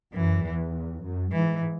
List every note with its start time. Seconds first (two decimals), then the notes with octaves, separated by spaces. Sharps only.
0.14 F#2 E3
0.43 E2
1.03 F#2
1.32 G#2 E3